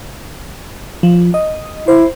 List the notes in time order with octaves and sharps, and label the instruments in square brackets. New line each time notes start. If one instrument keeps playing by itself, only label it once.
[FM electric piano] F3
D#5
[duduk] E4 [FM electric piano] C5